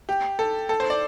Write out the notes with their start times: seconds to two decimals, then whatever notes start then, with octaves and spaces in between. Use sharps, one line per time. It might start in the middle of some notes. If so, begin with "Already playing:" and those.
0.09 G4
0.39 A4
0.69 A4
0.80 C5
0.90 D5